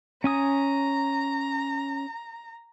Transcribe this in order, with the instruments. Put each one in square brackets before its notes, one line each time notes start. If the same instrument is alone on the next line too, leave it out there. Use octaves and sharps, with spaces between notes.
[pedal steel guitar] C#4 G#5 D#6 [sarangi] A#5